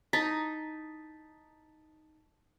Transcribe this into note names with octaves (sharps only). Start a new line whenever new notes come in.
D#4 E4 A5 A6 B6